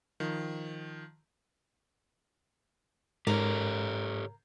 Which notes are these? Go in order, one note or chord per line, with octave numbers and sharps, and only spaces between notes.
D#3 F3
G#2 G4 A4 A#4 C#5